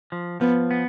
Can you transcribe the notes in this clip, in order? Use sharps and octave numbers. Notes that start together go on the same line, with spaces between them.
F3
F3 B3
B3